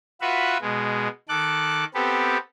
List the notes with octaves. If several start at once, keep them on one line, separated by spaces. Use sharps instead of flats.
F4 F#4 B4 E5 F#5
B2 G#3
D#3 A4 D6 F#6
B3 C4 G4 A4 B4